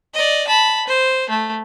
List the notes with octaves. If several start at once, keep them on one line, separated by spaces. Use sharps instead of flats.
D5 D#5
A5 B5
C5
A3